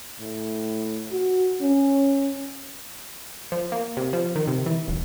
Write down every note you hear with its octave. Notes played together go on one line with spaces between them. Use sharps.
A2
F#4
C#4
F3
A#3
C3
F3
D#3
C3
E3
D#1